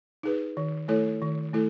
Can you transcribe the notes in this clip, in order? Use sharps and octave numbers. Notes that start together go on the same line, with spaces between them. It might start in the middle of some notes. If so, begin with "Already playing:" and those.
D#4 G#4 B4
D#3
A3 E4 A4 C#5
D#3
A3 E4 A4